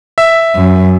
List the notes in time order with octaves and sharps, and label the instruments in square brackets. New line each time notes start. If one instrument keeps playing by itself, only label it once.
[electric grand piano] E5
[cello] F#2